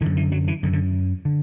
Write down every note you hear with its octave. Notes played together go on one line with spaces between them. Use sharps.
F#2 D3 E3
E3
F#3
E3
F#2 D3
D3
D3